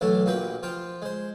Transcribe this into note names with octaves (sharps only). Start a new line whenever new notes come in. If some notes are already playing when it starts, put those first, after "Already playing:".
B1 E3 F#3 A3 A4
A#1 A#2 F#4 G4 B4 G5
F3 F4 G5
G#3 C5